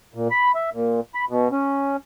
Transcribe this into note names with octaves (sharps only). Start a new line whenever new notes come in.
A#2
B5
E5
A#2
B5
B2
C#4